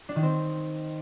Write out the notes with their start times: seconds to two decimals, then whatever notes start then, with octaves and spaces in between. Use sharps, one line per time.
0.09 D4
0.16 D#3
0.23 C4